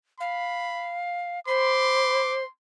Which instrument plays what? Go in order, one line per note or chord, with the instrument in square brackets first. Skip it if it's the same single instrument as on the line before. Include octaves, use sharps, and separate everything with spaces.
[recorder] F5 [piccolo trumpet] B5
[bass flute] C5 [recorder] B5 [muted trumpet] C6 [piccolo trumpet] D6